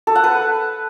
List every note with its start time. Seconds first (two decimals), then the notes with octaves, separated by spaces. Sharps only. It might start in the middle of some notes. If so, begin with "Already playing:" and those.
0.07 A4
0.15 F#5
0.24 B4